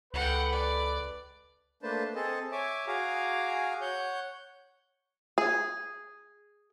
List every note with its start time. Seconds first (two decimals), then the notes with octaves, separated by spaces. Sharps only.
0.14 C#2 A4 B4 F#5 G5
0.52 D5
1.83 A3 A#3 D4 B4 C5 A5
2.15 C4 G#4 A4 D#5 A5
2.52 C#5 E5 G#5 D6
2.87 F#4 G#4 F5 G#5 A#5 D6
3.81 C#5 F#5 G6
5.38 G#4